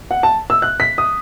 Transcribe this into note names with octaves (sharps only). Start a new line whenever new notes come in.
F#5
A5
E6
F#6
B6
D#6